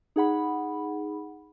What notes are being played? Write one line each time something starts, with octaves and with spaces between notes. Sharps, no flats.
D#4 G#4 F#5 B5